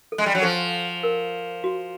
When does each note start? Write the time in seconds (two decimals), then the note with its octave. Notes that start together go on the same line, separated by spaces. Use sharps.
0.12 A4
0.18 G#3
0.26 G3
0.35 F#3
0.42 F3 A4
1.03 A#4
1.64 F#4